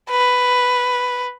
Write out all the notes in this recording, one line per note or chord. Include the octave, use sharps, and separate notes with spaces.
B4